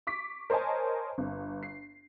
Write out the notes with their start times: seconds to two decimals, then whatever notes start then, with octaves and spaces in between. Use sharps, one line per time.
0.07 C#6 D6 B6
0.50 A#4 C5 C#5 D#5 G#5 A5
1.18 G1
1.63 C7